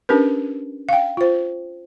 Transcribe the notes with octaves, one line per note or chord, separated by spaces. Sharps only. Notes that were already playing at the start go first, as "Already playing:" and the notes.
C#4 D4 G4 A#4 B4
F5 G5
F4 C5